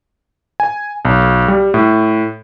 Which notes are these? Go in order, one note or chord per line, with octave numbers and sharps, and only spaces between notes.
G#5
B1
G3
A2